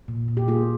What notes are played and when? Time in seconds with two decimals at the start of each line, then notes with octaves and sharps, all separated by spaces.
0.08 A#2
0.28 A#2
0.37 G4
0.48 A#3 F4 G#4